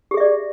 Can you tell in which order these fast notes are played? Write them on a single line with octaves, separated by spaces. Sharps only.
G4 G#4 E5 D5